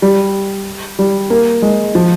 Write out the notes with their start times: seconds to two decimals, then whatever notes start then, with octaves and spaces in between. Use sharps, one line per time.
0.02 G3
0.99 G3
1.30 A#3
1.62 G#3
1.95 F3